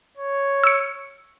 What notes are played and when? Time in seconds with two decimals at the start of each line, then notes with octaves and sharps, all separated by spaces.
0.17 C#5
0.64 E6 C#7